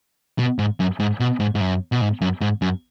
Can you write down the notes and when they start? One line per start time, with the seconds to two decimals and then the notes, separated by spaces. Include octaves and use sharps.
0.39 B2
0.59 G#2
0.80 F#2
1.00 G#2
1.20 B2
1.40 G#2
1.55 G#2
1.61 F#2
1.92 B2
2.01 G#2
2.21 F#2
2.41 G#2
2.62 F#2